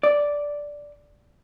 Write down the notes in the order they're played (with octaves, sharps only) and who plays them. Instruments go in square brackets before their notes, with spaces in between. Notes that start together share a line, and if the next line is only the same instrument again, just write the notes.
[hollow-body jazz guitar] D5